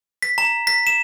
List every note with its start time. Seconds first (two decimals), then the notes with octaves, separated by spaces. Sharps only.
0.22 B6
0.38 A#5
0.67 B6
0.87 E7